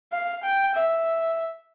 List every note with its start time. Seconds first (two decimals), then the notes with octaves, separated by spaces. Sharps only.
0.12 F5
0.43 G5
0.74 E5